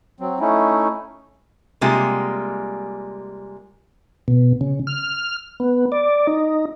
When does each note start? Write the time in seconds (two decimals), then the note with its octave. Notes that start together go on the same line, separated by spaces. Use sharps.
0.20 F#3 C4
0.40 A3 C#4 D#4 E4
1.81 C3 G3 G#3 A#3 F4
4.28 B2
4.61 C#3
4.87 F6
5.60 B3
5.92 D5
6.27 D#4